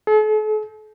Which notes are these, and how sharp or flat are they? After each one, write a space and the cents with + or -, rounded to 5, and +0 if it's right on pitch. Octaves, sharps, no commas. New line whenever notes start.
A4 -45